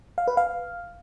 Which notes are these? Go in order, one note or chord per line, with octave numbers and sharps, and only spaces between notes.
F5
B4
F5